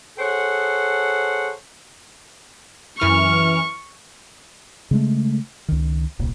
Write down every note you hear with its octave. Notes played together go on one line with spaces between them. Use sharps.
G#4 A4 C5 C#5 F#5
F#2 E3 C#6 F6
C#3 G#3 A3
C#2 D#3
D#1 C2 A#2